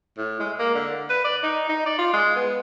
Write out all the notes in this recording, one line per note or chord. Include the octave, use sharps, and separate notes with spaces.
A2
G#3
A#3
D3
B4
D5
D#4
D#4
D5
F4
G#3
B3